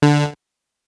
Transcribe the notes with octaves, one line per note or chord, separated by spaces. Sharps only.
D3